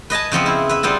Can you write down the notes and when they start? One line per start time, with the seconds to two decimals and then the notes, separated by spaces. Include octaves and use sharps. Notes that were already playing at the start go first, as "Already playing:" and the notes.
0.10 B4 D#5 G#5 A5
0.31 C#3 F3 B3 C4
0.46 E4
0.69 B4 E5
0.83 G3 B3 C4 F4